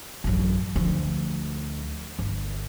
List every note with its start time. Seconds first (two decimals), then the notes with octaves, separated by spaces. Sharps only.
0.24 A1 F#2
0.76 D2 F3
2.19 G1